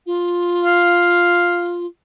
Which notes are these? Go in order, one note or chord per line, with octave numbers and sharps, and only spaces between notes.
F4
F5